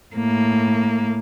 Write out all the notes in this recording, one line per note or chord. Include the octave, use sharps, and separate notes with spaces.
A2 A#3